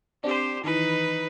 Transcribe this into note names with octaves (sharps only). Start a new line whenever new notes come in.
C4 D4 G4 C5
D#3 E3 D#4 B4